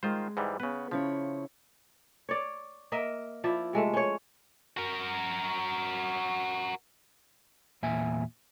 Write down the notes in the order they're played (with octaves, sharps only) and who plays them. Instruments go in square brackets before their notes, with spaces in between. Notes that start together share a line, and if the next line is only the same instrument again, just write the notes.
[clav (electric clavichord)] D#3 F4 C5 [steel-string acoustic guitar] G#3
[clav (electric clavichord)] G#2 E3 G3
[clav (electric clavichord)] C#3 B4 [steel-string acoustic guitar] B3
[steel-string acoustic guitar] C#3 E4 C#5 [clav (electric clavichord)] F3
[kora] C#5 D5
A#3 A#4 D#5 E5
F3 E4 D5
C3 G#3 A3
C#4 C#5
[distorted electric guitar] F#4 A#4
[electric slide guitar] E2 A#2 E5 G#5